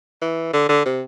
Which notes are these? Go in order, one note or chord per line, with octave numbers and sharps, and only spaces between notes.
E3
D3
D3
C3